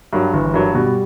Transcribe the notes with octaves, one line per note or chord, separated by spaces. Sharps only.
G2 F#3
G1 E3
G2 F#3
B2 G3